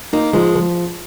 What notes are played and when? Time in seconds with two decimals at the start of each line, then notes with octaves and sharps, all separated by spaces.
0.13 A#3 D#4
0.33 F3 G#3
0.55 F3